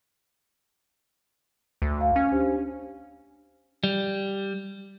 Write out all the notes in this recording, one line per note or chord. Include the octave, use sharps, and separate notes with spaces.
D2
F5
C#4
D4 G4 C5
G3